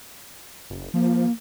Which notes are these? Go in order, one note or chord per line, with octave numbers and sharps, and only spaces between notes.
F#1
F3 A#3